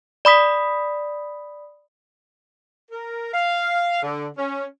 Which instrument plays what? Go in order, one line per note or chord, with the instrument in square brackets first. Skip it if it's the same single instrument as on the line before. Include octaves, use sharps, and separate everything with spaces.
[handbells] D5 B5 D#6 B6
[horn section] A#4
F5
D3
C#4